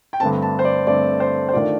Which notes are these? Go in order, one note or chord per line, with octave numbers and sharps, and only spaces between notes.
G5
G2 D3 A3 C4 A5
A5
C5
D5
G2 D3 A3 C4 D5
C5
C5
D#3 A3 D4 F4 D5